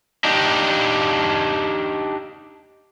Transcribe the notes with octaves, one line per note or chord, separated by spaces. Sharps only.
D4 D#4 G4